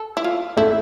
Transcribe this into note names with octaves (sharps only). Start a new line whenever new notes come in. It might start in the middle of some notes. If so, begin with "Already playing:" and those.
Already playing: A4
E4
F4
A3 E4